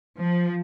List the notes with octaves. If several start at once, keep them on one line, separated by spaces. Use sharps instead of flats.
F3